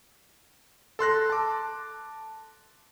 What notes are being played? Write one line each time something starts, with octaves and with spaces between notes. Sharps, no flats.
A4 C6 F#6 A#6
A5 D6